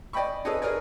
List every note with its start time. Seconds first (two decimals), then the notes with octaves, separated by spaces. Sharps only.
0.13 D5 D#5 G5 B5 C#6
0.45 D#4 G#4 A4 B4 C#5 D#5
0.62 G#4 A#4 B4 C#5 D5